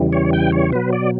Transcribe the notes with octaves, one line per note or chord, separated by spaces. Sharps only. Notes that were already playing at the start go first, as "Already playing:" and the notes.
Already playing: E2 C#3 E3 G3
C#5
G5
C#5
B2 F#3 B4
D5